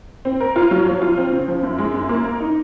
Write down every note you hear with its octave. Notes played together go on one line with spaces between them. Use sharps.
C4
A#4
F4
F#3
F3
F4
C4
C#3
F3
F#2
G#3
F#2
A#3
A#4
D#4